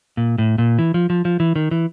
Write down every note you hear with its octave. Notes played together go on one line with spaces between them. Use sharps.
A#2
A2
A#2
E3
F3
F3
F3
E3
D#3
E3